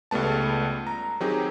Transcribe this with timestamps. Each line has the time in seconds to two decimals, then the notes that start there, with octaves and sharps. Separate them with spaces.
0.11 C#2 G3 A3 B3 A5
0.87 A#5
1.20 D#3 F#3 C4 D#4 G4 G#4